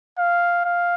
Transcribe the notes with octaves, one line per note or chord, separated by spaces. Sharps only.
F5
F5